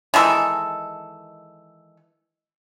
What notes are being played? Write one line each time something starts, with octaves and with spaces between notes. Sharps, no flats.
D#3 E3 G#3 A4